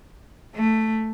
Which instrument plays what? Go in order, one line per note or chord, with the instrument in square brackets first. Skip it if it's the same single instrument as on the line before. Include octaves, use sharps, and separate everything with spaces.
[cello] A3